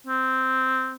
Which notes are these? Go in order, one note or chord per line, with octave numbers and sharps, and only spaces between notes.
C4